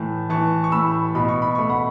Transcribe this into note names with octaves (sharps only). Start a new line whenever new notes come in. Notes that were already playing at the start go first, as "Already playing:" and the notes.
Already playing: A2 E3 A5
E3 A5 C#6
C#6
A2 B5 E6
B2 B5
C#6
B5
A3 C#6
F#5 B5